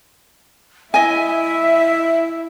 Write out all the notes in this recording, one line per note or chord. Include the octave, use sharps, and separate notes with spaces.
E4 D#5 E5 G#5